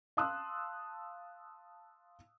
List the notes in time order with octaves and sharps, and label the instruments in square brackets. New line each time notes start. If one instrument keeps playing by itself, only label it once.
[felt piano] F5 A5 C6 D#6 E6 F#6